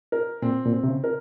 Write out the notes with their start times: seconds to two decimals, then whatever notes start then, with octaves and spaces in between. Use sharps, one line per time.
0.12 A#4
0.42 A#2 C4
0.65 A#2
0.73 C4
0.84 C3
0.89 C#3
1.04 A#4